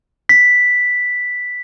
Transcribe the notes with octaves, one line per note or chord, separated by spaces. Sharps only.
B6